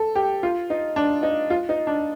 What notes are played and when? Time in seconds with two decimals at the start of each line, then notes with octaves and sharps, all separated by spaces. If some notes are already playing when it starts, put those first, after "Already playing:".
Already playing: A4
0.15 G4
0.43 F4
0.70 D#4
0.96 D4
1.23 D#4
1.50 F4
1.69 D#4
1.87 D4